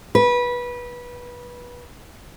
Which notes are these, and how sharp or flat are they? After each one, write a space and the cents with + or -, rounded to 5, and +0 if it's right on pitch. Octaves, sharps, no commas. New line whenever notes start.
B4 -20